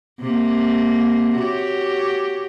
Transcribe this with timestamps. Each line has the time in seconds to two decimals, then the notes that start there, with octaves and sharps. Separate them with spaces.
0.20 C3 A#3
1.37 F#4 G4 C#5